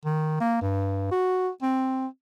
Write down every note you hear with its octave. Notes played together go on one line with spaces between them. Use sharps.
D#3
A#3
G2
F#4
C4